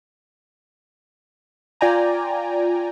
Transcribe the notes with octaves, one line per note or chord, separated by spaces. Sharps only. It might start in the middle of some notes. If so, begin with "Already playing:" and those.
F4 D5 G5 G#5 A#5